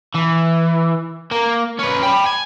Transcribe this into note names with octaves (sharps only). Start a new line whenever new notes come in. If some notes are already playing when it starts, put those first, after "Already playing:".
E3
A#3
C#4 B4
G5 B5
G#5